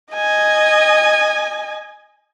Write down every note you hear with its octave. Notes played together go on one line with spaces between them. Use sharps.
D#5 G#5